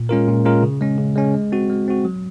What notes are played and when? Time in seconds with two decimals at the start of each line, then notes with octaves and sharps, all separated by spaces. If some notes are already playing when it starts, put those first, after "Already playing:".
Already playing: A#2
0.09 G#3 C#4 F4 A#4
0.28 A#2
0.45 G#3 C#4 F4 A#4
0.63 C#3
0.81 G#3 C#4
0.98 C#3
1.16 G#3 C#4
1.33 G#3
1.52 C4 F#4
1.70 G#3
1.88 C4 F#4
2.05 F#3